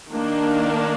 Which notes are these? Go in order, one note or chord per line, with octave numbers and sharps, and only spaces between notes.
D#3 A#3 D4